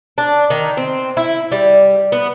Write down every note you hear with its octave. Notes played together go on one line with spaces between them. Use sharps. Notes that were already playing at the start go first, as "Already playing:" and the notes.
D4
D#3
C4
E4
G3
B3